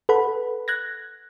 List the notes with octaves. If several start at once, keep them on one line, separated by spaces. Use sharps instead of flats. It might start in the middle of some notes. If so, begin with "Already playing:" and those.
A4 B4 F#5 B5
F#6 G#6 A#6